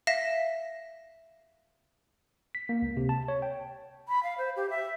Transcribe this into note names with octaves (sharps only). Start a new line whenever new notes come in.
E5 F5 A#6 B6 E7
B6
A#3
C#2
C3
A5
C#5
G5
B5
F5
C5
G4
E5